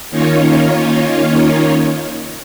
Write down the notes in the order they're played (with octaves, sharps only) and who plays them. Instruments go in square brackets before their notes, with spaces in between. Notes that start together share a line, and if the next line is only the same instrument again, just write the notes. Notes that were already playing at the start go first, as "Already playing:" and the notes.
[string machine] D#3 A#3 C#4 D#4 F4 C#5